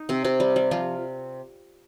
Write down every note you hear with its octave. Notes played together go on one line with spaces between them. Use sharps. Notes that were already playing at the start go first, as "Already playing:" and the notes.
Already playing: D#4
C3 C4
C3 C4
G3
G3
F3 F4